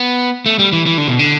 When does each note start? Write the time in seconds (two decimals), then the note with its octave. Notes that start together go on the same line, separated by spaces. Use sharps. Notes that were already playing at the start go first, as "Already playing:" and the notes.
Already playing: B3
0.46 A3
0.59 G3
0.73 E3
0.86 E3
0.98 D3
1.08 B2
1.19 D3